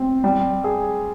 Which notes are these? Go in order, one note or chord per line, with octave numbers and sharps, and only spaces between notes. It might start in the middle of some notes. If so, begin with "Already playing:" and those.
Already playing: C4
G3
G#4